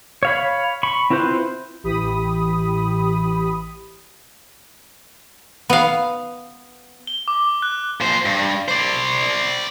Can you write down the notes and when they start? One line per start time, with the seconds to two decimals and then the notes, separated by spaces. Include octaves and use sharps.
0.23 C#5 F5 B5
0.83 B5 C#6
1.10 C4 E4 F4 B4 C5
1.83 A1 E3 G4 B5 D#6
5.69 B3 F5
7.07 G7
7.28 D6
7.62 F#6
8.01 A#2 C5
8.25 G2
8.68 C5 D5